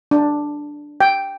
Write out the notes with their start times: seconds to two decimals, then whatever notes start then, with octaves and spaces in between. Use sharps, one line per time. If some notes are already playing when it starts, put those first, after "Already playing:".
0.11 D4
1.01 G5